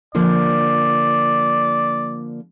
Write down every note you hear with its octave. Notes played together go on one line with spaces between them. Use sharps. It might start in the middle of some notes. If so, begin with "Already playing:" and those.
D3 F3 A#3 D5